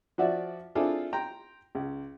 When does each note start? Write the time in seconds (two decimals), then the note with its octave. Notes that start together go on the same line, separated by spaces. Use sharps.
0.18 F3 F4 F#4 D5 E5
0.75 C4 D4 E4 F4 G#4 A4
1.13 G5 A#5 C6
1.75 C#2